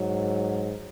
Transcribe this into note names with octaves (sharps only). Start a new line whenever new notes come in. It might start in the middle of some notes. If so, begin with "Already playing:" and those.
Already playing: G#2 F#3